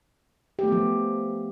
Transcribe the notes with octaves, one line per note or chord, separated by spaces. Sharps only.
F3 A3 B3 G4